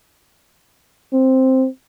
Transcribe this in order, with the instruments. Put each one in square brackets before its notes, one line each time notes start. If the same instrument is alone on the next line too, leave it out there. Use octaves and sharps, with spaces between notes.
[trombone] C4